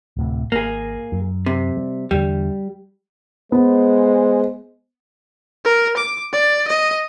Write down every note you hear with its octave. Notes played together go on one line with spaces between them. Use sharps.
D1 A2 C3
G#1 A#3 G#4
F#2
C3
G3
E2 D3 G3
G#3 B3 C5
A#4
D6
D5
D#5